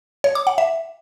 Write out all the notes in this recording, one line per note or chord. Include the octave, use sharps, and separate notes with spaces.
C#5
D6
F#5
E5